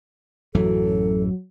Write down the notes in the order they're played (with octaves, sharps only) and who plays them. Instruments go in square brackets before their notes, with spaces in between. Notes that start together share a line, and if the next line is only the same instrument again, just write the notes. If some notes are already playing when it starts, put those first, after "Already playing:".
[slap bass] A1 F#2 E3 [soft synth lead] F#3 [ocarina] A4